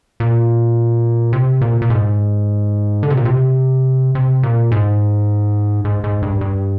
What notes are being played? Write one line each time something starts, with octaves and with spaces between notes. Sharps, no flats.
A#2
C3
A#2
A#2
G#2
D3
C3
A#2
C3
C3
A#2
G#2
G#2
G#2
G2
G2